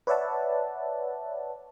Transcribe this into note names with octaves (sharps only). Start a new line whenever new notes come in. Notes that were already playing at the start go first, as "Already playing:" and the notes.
B4 C#5 D5 E5 F#5 A5